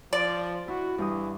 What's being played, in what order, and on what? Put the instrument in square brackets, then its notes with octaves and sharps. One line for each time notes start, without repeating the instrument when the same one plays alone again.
[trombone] F3 [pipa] D5
[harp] E4 [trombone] F#4
[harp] G2 D#6 [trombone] E3